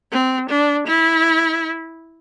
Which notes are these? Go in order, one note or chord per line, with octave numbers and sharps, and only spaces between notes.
C4
D4
E4